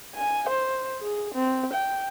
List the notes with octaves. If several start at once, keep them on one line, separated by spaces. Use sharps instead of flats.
G#5
C5
G#4
C4
G5